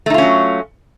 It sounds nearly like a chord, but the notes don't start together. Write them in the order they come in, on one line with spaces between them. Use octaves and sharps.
A3 D#4 F4 C#4 F#3